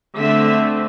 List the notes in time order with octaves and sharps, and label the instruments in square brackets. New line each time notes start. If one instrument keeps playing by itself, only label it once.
[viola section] D3 A3 C4 E5